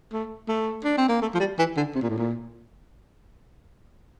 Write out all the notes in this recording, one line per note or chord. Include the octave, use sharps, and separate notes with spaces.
A3
A3
D4
C4
A#3
A3
F3
G3
E3
D3
C3
A#2
A2
A#2